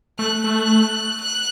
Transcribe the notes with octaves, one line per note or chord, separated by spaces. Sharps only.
A3 F#6
A3
F#6